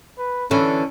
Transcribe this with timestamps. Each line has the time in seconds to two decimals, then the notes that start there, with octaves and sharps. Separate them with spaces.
0.18 B4
0.51 D3 E3 C#4 A4